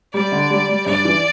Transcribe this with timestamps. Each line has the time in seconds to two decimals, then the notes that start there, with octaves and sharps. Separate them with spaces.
0.14 G3 D5
0.32 D3
0.50 G3
0.69 G3
0.86 G2 D5
1.05 E3